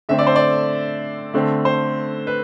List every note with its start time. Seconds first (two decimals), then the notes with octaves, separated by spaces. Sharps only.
0.09 D3 A3 C4 E5
0.19 D5
0.27 C5
0.36 D5
1.34 D3 A3 C4
1.65 C5
2.27 B4